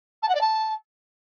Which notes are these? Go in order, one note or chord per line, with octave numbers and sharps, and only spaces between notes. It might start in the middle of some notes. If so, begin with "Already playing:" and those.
A5
F#5
D5
A5